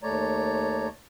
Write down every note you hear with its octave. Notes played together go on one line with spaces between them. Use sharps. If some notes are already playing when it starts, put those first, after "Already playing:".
D#2 A3 C#5 D5 A#5